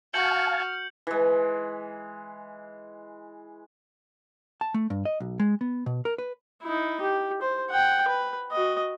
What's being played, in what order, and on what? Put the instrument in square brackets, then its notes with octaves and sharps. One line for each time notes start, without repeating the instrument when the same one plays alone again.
[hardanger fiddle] F#4 [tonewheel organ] F5 G#5 A5 [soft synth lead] F6 [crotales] G6 C#7 F#7
[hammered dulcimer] E3 G#3
[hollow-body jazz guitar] A5
A3
G2
D#5
B1
G#3
B3
B2
A#4
B4
[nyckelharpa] D#4 E4
G4
C5
F#5 G5
B4
F#4 D#5